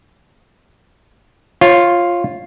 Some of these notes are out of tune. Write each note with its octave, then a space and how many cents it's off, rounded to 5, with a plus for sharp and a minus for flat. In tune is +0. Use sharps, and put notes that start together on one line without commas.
F4 +0 C#5 -25